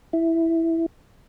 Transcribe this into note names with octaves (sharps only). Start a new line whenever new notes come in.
E4